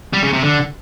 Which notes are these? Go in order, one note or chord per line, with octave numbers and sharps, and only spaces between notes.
G3
C#3
C3
D3